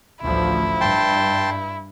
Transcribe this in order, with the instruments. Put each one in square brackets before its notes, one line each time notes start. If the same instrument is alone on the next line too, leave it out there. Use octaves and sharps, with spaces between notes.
[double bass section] A1 D2 F3 [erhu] E4
[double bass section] G2 [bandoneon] G5 A5 C6